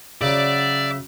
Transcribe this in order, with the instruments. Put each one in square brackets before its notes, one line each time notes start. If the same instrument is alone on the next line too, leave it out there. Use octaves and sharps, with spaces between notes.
[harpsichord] C#3 F#3 [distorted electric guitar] D5 [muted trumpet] E5